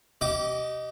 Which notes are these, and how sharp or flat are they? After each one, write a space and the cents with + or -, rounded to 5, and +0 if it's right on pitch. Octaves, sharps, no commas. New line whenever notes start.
G4 -30 D#5 +0 D6 +0